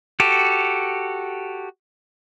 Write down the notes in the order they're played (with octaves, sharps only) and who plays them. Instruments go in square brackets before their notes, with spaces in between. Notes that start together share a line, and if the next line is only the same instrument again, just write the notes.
[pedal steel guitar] F#4 G4 A4